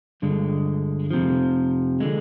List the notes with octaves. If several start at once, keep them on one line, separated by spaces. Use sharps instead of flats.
G2 D3 G#3
F2 C3 F3
D3 G#3